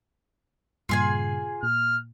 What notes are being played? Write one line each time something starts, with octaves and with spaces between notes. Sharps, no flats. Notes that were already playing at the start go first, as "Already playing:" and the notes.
G2 A#2 C#3 F4 G#4 G#5
A#2 F6